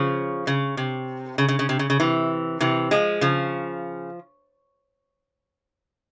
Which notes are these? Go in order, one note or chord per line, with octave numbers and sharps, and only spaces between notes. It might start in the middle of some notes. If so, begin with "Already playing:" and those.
Already playing: C#3 F3
C#3
C3
C#3
C#3
C#3
C3
C#3
C#3
C3 E3
C3 E3
F3 G#3
C#3 F3